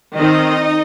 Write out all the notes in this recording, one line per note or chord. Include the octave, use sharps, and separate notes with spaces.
D#3 C4 D#4 D#5